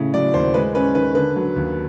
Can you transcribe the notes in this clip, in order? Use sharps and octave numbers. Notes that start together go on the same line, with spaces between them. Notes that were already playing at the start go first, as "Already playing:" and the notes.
Already playing: A2 C#3
F#3 D5
D#2 C5
G#3 B4
C#4 B4
D#3 B4
D3 B4
F#3
D#2